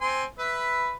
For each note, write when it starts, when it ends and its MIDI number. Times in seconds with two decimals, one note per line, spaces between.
0.01 0.24 60
0.01 0.24 80
0.01 0.24 84
0.39 0.93 71
0.39 0.93 76
0.39 0.93 83